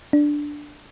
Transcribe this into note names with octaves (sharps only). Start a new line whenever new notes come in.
D4